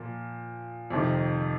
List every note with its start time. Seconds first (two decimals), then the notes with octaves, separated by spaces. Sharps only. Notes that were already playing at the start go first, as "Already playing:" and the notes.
Already playing: A#2 F3
0.91 F2 C3 D#3